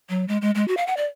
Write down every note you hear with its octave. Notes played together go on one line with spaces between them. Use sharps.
F#3
G#3
G#3
G#3
F#4
F5
F#5
D5